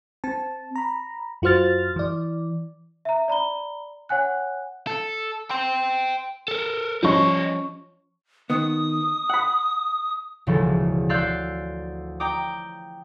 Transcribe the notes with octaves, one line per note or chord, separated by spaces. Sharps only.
C4 A5
A#5 B5
F#2 F4 F#4 C5 F6 A6
E3 D5
E5 A#5
D5 A#5 B5 G7
C#5 F#5 G#5 F#6
A4
G5 C6
A4 A#4
F3 G3 C#4 D#5 C#6
D#3 B3 D#6
F#5 B5
E1 D2 C#3 E3 F3 A4
D5 F5 C6 E6 F#6 G6
G5 A#5 D6 D#6